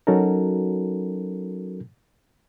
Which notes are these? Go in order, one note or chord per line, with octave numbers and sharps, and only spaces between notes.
F#3 C#4 D#4 F#4 A4 A#4